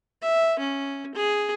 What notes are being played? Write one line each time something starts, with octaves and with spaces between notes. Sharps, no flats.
E5
C#4
G#4